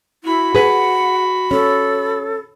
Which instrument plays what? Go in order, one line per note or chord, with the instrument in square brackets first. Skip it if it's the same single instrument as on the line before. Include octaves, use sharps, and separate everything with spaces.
[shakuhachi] E4 [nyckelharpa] F#4 B5
[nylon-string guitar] G#4 B4 [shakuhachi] F#5
[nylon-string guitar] C#4 [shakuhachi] A4